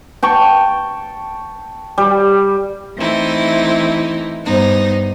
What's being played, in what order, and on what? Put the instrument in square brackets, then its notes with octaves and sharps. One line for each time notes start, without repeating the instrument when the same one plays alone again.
[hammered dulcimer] G5 A5 C#6
G3
[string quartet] E3 A3 C4 D#4 E4
G2 B3 D#4 C5